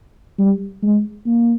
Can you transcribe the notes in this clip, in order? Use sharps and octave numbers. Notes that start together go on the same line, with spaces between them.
G3
G#3
A#3